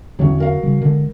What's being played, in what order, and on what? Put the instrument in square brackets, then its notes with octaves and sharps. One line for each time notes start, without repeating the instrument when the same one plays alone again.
[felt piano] A1 F#3 C#5 [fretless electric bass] E2 D3
[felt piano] F#3 A#4 F5
[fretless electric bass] C#3 G3
[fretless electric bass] D3 G#3 [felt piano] A#4